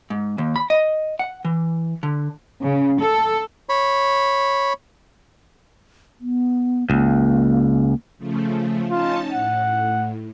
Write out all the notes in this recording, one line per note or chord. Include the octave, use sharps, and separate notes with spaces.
G#2
D#2
B5
D#5
F#5
E3
D3
C#3
A4
C#5 B5
B3
C#2 A#3
C#3 F3 A3
C#4 D#4 F4 A5
A2 F#5